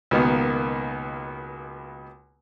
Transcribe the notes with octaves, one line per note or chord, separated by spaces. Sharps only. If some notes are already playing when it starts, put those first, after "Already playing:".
C#2 B2 D#3 A#3 B3